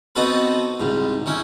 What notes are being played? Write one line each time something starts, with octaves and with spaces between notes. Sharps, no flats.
B3 C4 D#4 F#4 A4 B4
C2 G#2
D#3 C#4 E4